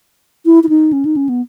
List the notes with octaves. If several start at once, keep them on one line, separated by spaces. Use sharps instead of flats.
E4
E4
D#4
C#4
D#4
C#4
B3